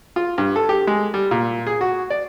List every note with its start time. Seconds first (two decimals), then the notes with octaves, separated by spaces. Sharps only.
0.16 F4
0.38 G2
0.56 A4
0.69 G4
0.87 G#3
1.14 G3
1.31 A#2
1.67 G#4
1.81 F#4
2.10 D5